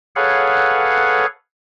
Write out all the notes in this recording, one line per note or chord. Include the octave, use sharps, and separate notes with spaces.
G#4 A4 B4 C#5 F5 F#5